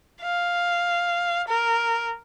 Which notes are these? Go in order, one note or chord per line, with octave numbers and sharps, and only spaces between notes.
F5
A#4